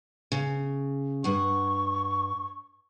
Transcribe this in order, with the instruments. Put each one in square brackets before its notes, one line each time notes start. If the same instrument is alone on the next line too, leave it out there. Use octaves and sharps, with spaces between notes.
[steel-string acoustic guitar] C#3
[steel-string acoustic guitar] G2 F#5 [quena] C#6